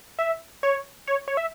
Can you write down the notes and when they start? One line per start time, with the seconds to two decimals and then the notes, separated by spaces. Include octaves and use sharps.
0.19 E5
0.63 C#5
1.07 C#5
1.28 C#5
1.37 E5